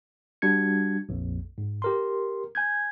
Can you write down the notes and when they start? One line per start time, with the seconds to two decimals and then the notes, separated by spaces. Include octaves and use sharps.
0.42 G3 D4 F#4 G#6 C#7
1.09 A#1 F2
1.58 G#2
1.82 G4 A#4 C6
2.55 G#5 G6 G#6